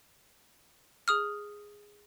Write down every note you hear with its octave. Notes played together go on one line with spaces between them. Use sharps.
G#4 D#6 F6